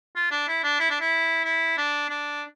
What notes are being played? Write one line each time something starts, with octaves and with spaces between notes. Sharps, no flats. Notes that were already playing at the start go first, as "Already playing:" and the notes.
F4
D4
E4
D4
E4
D4
E4
E4
D4
D4